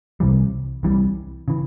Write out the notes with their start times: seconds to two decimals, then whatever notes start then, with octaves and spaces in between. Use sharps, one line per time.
0.20 C2 C3 E3 G3
0.83 C2 C3 E3 G3
1.48 C#3 E3